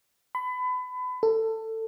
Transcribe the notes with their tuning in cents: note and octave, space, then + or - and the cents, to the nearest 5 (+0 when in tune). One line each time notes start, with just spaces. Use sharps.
B5 +30
A4 +20